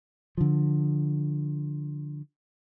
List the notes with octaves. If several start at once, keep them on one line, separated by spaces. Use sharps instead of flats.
D3 F3